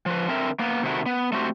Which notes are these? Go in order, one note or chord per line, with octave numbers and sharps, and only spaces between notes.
F3 B4
D3 C4 A#4 E5
A#3 B3
C3 D#3 A3 E4 F#4
B3
A3 C4 F#4 G4